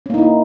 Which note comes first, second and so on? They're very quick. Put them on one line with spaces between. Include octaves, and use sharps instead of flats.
C#4 A#3 D#4 E4